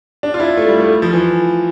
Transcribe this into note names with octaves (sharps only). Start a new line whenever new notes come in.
D4
F4
E4
A3
G3
A3
F3
E3